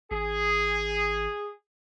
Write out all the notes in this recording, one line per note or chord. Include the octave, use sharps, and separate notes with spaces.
G#1 G#4